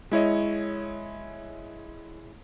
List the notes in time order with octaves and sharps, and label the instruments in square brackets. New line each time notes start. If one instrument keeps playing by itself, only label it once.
[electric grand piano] G#3 E4 C#5 D#5